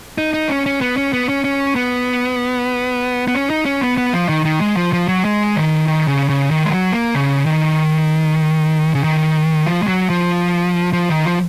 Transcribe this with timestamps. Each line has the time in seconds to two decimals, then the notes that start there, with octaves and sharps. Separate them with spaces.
0.18 D#4
0.34 D#4
0.49 C#4
0.66 C#4
0.81 B3
0.97 C#4
1.13 B3
1.29 C#4
1.44 C#4
1.76 B3
3.28 B3
3.35 C#4
3.50 D#4
3.66 C#4
3.81 B3
3.97 B3
4.13 F3
4.29 D#3
4.45 D#3
4.61 G#3
4.77 F3
4.93 F3
5.08 F#3
5.25 G#3
5.56 D#3
5.88 D#3
6.08 C#3
6.29 C#3
6.51 D#3
6.65 G#3
6.71 F#3
6.92 A#3
7.15 C#3
7.46 D#3
8.95 C#3
9.04 D#3
9.66 F3
9.83 G#3
9.88 F#3
10.10 F3
10.93 F3
11.09 D#3
11.25 F3